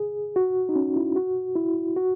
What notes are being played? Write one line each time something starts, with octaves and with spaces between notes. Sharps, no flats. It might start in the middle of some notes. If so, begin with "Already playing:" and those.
Already playing: G#4
F#4
D#4
C#4
E4
F#4
E4
F#4